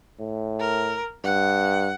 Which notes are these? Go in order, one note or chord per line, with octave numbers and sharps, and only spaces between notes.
A2
A#4
G2 F#5